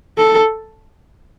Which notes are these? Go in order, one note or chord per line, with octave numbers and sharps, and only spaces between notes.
A4